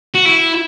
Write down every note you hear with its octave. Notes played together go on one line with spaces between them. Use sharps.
F#4
E4